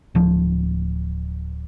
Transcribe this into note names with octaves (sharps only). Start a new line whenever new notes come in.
D1 F3